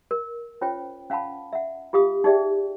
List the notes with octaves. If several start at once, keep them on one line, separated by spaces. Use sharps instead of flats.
A#4
C#4 F4 C5 C#5 G5
C#4 F5 F#5 A5 B5
E5 F#5
F4 G4 F5 D#6
D#4 G4 G#4 D5 E5 G5